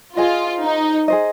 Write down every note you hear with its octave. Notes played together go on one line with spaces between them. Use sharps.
F4 G#4 C5 D#5
D#4
G#4 C5 D#5